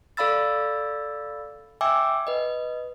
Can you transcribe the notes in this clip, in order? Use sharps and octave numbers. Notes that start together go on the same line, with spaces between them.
A4 D5 F5 B5 E6 A6
E5 G5 G#5 D6 E6
B4 D#5